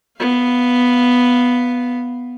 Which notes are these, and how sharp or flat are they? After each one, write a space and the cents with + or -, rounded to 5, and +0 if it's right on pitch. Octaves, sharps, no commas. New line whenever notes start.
B3 +0 F5 +0